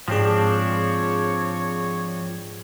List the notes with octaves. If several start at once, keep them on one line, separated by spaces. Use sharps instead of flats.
G#2 F3 C4 D4 G#4 C#5